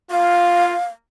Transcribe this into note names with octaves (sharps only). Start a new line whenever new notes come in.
F4 F5